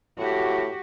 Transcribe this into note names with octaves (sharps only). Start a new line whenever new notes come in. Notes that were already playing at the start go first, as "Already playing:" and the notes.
A2 F#4 G4